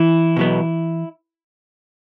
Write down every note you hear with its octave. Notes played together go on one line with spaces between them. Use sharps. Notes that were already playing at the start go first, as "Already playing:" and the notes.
Already playing: E3 E4
B2 F#3 B3